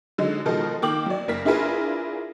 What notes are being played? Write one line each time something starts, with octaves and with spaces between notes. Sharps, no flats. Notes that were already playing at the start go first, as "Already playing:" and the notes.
D3 F#3 G#3 D#4
B2 D#3 F3 G#3 A4 A#4
D#3 A#3 G5 D6 F#7
F#3 D5
F#1 A#3 A#4 B6
D4 E4 F4 G#4 A#4 B4